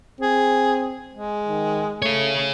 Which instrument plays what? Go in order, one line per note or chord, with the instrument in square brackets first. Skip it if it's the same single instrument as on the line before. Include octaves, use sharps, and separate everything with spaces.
[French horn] C4 [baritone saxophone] G#4
[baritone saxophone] G#3
[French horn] D#3
[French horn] A3 [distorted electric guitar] G#4 C#5